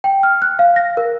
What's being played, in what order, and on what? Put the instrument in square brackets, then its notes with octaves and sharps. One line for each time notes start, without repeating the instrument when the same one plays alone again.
[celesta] G5
F6
F#6
F5
A#6
A#4